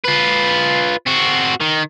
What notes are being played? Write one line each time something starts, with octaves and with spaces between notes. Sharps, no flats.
F4 B4
C4 F#4
D#3